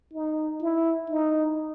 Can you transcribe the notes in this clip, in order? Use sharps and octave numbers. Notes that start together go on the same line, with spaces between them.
D#4
E4
D#4